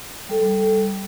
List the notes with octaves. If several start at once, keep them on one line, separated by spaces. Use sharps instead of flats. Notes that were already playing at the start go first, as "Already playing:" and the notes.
G3 A4